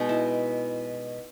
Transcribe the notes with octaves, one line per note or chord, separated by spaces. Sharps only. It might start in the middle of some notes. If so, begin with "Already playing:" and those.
Already playing: B2 G#3 B3 D#4
E4